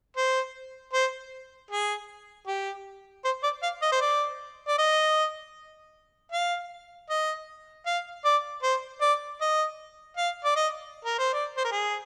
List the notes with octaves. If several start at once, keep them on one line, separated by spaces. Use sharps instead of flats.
C5
C5
G#4
G4
C5
D5
F5
D#5
C5
D5
D5
D#5
F5
D#5
F5
D5
C5
D5
D#5
F5
D5
D#5
A#4
C5
D5
C5
A#4
G#4